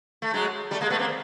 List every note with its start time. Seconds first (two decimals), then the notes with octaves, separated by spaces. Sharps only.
0.22 A3
0.34 F#3 G#3
0.71 G3 A3
0.81 G#3 A#3
0.90 A3 B3
0.99 A#3 C4